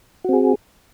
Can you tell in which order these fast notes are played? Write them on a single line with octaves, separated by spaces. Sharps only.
F#4 C4 G#4